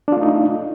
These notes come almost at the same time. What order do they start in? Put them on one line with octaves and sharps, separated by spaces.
D4 F4 A3 D#4